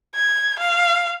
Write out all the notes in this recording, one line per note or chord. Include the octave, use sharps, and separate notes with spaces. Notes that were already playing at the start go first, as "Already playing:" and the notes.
G#6
F5